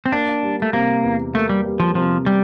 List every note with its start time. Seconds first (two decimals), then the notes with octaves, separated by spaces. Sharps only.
0.06 C4
0.12 A#3 D4
0.43 G3
0.62 A3
0.73 C3 A#3
1.04 E2
1.34 A3 A#3
1.49 G3
1.66 G3
1.80 F3
1.95 C3 F3
2.26 G3